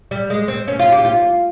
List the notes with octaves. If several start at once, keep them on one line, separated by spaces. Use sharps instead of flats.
G3
G#3
C4
C#4
F4
G4
F4